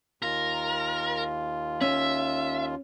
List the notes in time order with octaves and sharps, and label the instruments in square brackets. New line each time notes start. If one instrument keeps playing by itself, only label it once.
[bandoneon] D#2 F4 [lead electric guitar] A#4
[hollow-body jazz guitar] C#4 [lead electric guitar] E5